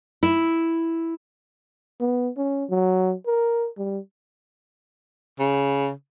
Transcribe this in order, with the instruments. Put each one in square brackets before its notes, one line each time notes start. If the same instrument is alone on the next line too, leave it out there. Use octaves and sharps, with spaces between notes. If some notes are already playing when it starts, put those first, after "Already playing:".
[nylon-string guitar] E4
[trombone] B3
C#4
F#3
A#4
G3
[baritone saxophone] C#3